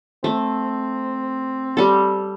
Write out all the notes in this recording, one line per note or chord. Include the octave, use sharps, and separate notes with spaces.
A3 C4
G3 A4